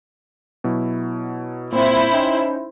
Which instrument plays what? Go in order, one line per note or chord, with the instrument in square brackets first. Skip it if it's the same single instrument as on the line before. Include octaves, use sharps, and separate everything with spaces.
[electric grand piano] B2 F#3 E4
[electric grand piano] A#2 C4 [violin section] E4 C5
[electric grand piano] C#4 D#4 G5